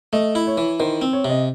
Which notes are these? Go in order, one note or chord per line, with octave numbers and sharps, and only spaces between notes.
A3 D#5
E4
C#5
E3
D#3 C5
C4
C#5
C3 D#5